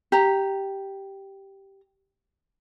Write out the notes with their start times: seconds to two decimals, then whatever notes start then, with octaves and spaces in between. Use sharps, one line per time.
0.12 G4 A#5